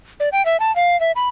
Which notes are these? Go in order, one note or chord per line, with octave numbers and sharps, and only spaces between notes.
D5
G5
E5
A5
F5
E5
B5